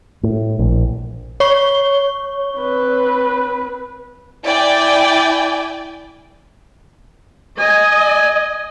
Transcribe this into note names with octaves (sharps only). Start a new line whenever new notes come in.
A2
A#1
C#5 C#6 G7
C4 B4
E4 D5 G5 G#5
D#5 G#5